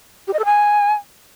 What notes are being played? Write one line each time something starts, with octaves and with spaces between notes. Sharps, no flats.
G4
D#5
A4
G#5